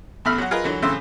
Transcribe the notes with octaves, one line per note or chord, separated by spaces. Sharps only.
A1 E2 A3 E5 B5 F6
F#3 F#4
F4 G#4 A#4 B4 D#5
D3 E3 F#3
A2 C#3 E3 C4 E5 C6